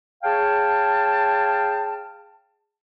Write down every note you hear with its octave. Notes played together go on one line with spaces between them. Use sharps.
G#4 C#5 F5 G5 A5